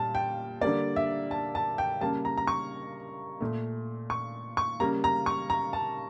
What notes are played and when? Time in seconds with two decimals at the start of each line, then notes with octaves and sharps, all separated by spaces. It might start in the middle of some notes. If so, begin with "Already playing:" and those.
Already playing: A#2 G3 A5
0.15 G5
0.61 D3 G3 A#3 D5
0.96 E5
1.31 A5
1.55 A5
1.78 G5
2.01 C#3 G3 A#3 A5
2.25 A#5
2.37 A#5
2.47 C#6
3.41 A#2 A3
4.10 C#6
4.57 C#6
4.80 C#3 G3 A#3 A#5
5.04 A#5
5.26 C#6
5.50 A#5
5.73 A5